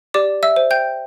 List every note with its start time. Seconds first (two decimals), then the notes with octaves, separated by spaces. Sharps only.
0.14 G4 D5 D6
0.43 E5 E6
0.56 C5
0.71 G5 G6